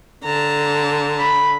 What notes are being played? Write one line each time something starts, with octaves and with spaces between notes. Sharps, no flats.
D3 A5 A#5
B5